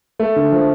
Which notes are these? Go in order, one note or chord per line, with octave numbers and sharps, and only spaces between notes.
A3
D3
F3